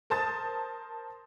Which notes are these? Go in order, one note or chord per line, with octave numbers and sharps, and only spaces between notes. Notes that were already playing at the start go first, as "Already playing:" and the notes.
A#4 C5 A5 D#6 A6